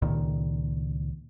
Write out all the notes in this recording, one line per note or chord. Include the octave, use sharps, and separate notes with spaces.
C#2 A#2 D#3